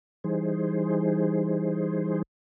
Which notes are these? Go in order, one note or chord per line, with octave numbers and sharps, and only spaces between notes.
E3 G3 D#4 G#4 C5